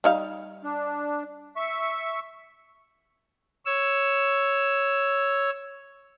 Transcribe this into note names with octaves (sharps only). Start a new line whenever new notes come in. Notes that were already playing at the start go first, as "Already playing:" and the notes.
G3 D#4 F5
D4
E5 C#6
C#5 E6